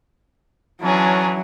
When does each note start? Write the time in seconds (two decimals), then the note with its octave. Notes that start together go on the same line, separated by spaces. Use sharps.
0.83 E3 F#3 C#4 D4 G#4 C#5 A5 A#5